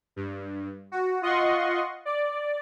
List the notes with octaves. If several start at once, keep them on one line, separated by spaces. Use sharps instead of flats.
G2
F#4
F4 D#5 F#5 C6 C#6
D5